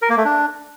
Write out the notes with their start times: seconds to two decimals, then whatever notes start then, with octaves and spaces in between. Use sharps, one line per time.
0.02 A#4
0.10 A#3
0.17 A3
0.25 D4